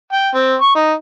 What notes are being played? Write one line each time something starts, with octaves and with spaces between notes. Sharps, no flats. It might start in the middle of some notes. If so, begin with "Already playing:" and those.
G5
C4
C#6
D#4